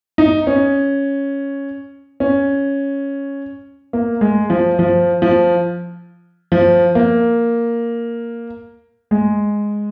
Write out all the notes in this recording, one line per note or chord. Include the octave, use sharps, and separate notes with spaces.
D#4
C#4
C#4
A#3
G#3
F3
F3
F3
F3
A#3
G#3